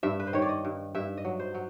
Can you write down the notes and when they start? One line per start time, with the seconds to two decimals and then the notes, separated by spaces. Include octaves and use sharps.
0.03 G2 E5
0.20 B4
0.27 C5
0.33 D#3 C#5
0.42 D5
0.49 D#5
0.65 G2
0.95 G2 E5
1.17 D#5
1.25 F#3
1.40 C5
1.54 F#3